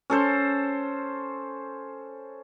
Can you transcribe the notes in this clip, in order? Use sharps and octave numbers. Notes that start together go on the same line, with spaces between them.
C#4 A4 C5